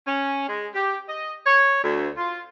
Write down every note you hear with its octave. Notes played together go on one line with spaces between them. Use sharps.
C#4
G#3
G4
D#5
C#5
D2
F4